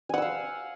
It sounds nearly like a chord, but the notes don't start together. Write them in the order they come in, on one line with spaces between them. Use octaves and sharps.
G#5 F#5 E6 F5